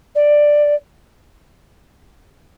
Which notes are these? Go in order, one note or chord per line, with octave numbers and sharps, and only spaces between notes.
D5